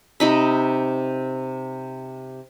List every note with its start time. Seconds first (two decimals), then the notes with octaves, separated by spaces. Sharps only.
0.20 C3 D#4 B5